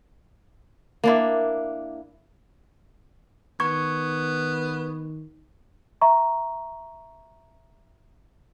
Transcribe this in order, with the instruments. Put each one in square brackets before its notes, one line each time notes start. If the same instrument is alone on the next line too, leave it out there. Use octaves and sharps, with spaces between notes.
[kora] A#3 D4 E4
[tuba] D#3 [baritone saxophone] B3 [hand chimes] C#6 G#6
[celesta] E5 A#5 C#6